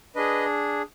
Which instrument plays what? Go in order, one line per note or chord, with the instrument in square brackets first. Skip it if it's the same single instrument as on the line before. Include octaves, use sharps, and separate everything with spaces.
[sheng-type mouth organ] D4 G#4 B4 D#5